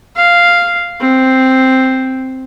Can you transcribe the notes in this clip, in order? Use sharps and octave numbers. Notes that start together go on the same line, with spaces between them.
F5
C4